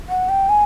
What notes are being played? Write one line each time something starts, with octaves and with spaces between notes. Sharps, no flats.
F#5
G5
G#5